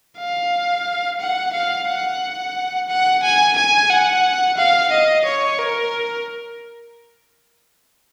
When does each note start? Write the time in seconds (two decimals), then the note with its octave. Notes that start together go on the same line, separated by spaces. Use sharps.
0.19 F5
1.20 F#5
1.53 F5
1.88 F#5
2.88 F#5
3.22 G#5
3.56 G#5
3.90 F#5
4.57 F5
4.91 D#5
5.25 C#5
5.58 A#4